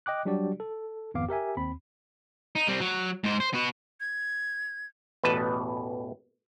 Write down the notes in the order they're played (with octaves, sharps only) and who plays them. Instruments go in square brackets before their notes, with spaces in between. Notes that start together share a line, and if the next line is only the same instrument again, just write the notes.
[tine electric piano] D#5 G5 D6 F#6
F#3 G3 D4 F#4 G4 D5
A4
G#1 F2 B3 F5 D6
G4 A#4 E5 G#5
D#2 C4 B5
[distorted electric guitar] D#4
G3 C4
F#3
G#2 C5
C5
B3 F#4
[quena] G#6
[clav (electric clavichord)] A1 E2 B2 B4 D#5 A5